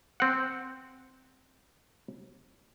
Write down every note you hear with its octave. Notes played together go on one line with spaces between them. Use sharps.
C4 F#5